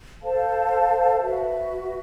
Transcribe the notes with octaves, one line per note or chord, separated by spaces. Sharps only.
A4 C5 F5 A5
F#4 B4 E5